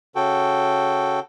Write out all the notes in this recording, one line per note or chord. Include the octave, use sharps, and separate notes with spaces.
C#3 F#4 A4 G5